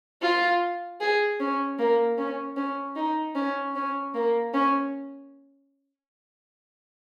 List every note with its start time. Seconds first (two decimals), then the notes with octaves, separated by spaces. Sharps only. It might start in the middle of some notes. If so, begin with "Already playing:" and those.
0.22 F4
1.00 G#4
1.40 C#4
1.78 A#3
2.18 C#4
2.57 C#4
2.96 D#4
3.35 C#4
3.75 C#4
4.14 A#3
4.54 C#4